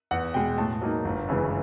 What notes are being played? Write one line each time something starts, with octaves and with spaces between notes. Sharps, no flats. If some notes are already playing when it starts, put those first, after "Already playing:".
E2 F#5
B2 G#3 G5
A2 A5
F#3 A#3 D#4
G1
F#2 C#3 E3 G#3